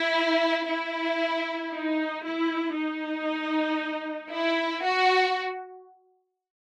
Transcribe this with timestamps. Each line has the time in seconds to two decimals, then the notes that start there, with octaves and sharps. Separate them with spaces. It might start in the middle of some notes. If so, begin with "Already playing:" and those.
Already playing: E4
0.69 E4
1.72 D#4
2.25 E4
2.76 D#4
4.32 E4
4.84 F#4